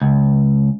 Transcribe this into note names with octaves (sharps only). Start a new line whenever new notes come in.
C#2